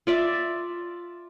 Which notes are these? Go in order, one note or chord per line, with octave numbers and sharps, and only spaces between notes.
F4 D5 E5